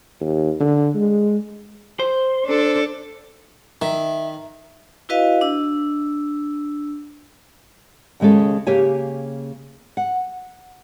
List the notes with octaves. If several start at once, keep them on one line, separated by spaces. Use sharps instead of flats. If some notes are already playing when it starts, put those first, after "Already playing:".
D#2
D3
G#3
C5
D4 A4
D#3 E5
E4 F#4 B4 D#5 F5
D4 E6
D#2 C#3 G#3 C#4 A4
C#3 A#3 G4 C#5 G#5
F#5